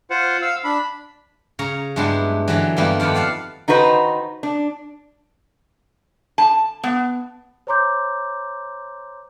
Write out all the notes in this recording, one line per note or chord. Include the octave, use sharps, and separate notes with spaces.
F4 C5 F#5
F5 E6
D4 B5
C#3 C#5 A#5
G2 F#3 G#3 B3 D4 E4
D3 E3 F#3
G2 G3 A#3 B3 E4
F2 D#3 D5 F#5 B5
D5 F5 F#5 A5
D#3 D#4 F#4 B4 C5
D4
A5
B3
C5 C#5 A#5 C6 D6 G6